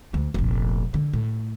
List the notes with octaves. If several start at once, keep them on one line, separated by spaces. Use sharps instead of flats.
D2
F1 A#1
D3
A2